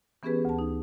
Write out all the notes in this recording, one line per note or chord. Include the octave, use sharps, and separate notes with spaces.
E3 B3 C#4 G4 G#4 B4
D2 A5
D#4